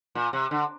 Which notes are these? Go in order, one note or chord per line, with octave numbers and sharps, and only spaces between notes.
A#2
C3
D3